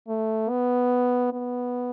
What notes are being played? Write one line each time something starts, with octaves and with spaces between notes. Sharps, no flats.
A3
B3
B3